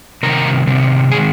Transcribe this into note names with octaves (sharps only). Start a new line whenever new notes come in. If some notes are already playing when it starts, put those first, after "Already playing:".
C3 D#3 G3 A#4
C3 D#3 G3
D#3 G#3 G#4